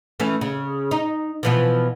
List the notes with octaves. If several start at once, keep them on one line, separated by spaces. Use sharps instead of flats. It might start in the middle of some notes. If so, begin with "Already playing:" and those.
E3 A3 C#4
C#3
D#4
B2 E3 F3